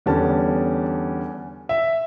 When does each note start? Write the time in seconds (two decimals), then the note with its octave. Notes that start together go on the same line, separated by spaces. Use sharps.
0.06 E2 D3 G3 C#4 A5
1.69 E5